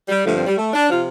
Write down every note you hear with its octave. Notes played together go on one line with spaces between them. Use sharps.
G3
G2 D3 F3 A3
C4
G3
A3
D4
C3 F3 F4